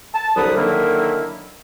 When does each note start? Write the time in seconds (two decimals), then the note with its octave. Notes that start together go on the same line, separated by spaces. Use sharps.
0.14 A5
0.36 C2 D3 F#3 B4 D#6
0.56 D3 D#3 F#3 A#3 E4